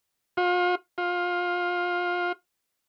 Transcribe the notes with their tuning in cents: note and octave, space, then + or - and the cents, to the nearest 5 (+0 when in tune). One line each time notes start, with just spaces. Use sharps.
F4 +35
F4 +20